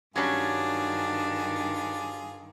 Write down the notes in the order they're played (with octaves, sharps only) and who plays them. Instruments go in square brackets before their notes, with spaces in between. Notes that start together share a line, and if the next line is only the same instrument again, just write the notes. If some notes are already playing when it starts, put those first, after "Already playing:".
[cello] G2 D#3 [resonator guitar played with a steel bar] F#3 G3 C#4 [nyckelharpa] D4 [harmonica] F4 G#4